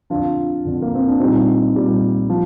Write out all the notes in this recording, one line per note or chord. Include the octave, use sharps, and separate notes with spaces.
F2 D3 F3 D4 F4
F2 D3 F3
A#3
C4
D4
A#2 G3 C4 D#4
A#2 G3
F3